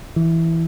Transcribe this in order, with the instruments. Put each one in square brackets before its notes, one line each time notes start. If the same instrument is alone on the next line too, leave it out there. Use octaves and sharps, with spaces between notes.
[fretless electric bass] E3